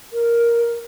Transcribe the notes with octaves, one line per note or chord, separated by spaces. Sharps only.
A#4